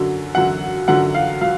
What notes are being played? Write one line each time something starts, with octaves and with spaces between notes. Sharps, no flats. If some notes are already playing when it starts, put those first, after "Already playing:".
Already playing: F#2 D3 F#3
F#2 D3 F#3 F#5
F#2 D3 F#3 F#5
F5
F#3 F5